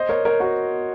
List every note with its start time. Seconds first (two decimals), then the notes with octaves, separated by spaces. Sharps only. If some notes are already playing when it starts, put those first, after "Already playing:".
Already playing: C5 D#5
0.09 A#4 C#5
0.25 A#4 C#5
0.40 F#4 A#4